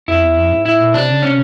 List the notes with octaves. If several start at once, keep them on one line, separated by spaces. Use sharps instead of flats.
F2 E4
E2
F2
G#2
A2 E4
A#2
C3 D4
C#3
C3 C#4